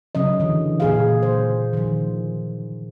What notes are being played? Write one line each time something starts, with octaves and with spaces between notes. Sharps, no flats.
C#3 F#3 C#4 D#5
D3 E3
A#2 G#4 F5
C5
D#3 F3